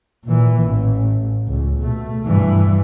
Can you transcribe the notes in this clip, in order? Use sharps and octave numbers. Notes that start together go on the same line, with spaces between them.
A#2 E3
A1
C#2
B2 A3
G2 E3